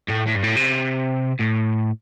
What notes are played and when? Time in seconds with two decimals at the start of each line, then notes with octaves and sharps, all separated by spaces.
0.09 A2
0.28 A2
0.36 G2
0.44 A2
0.57 C3
1.40 A2